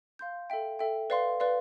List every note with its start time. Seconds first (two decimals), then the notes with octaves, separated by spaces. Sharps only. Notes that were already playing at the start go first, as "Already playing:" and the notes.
0.19 F5 C6 G6
0.50 A4 E5 G5
0.79 A4 E5 G5
1.10 B4 D5 F5 C6
1.40 B4 D5 F5 C6